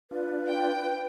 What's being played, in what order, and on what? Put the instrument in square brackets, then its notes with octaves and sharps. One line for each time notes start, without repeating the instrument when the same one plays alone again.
[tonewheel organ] D4 F4 [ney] B4
[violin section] G5